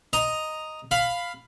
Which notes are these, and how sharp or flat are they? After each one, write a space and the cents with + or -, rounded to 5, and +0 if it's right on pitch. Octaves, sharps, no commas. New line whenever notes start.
D#5 +0 A#5 +0
F5 +0 B5 +15